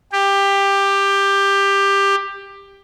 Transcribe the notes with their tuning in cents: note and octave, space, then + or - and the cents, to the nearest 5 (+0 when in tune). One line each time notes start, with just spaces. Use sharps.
G4 +15